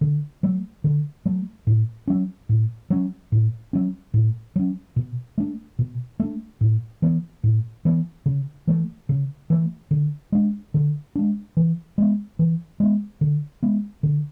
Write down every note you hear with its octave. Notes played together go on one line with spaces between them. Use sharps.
D3
F#3 A3
D3
F#3 A3
A2
F#3 C#4
A2
F#3 C#4
A2
F#3 C#4
A2
F#3 C#4
B2
A3 D4
B2
A3 D4
A2
E3 B3
A2
E3 B3
C#3
E3 A3
C#3
E3 A3
D3
G#3 D4
D3
G#3 D4
E3
G#3 B3
E3
G#3 B3
D3
G#3 B3
D3